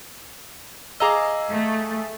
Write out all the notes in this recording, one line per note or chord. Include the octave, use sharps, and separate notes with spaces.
G#4 D#5 F5 A#5 D6 E6
A3